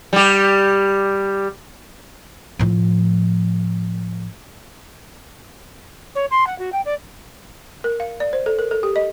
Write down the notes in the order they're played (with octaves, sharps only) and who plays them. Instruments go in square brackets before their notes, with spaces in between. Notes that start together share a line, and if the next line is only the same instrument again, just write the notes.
[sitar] G3 G4
[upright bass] A2 F3
[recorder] C#5
C6
F#5
F#4
G5
D5
[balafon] A#4
F5
D5
C5
A4
A#4
A4
G4
D#5